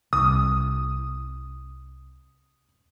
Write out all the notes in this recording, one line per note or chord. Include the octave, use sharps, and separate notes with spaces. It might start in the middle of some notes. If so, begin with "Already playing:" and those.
C2 D#6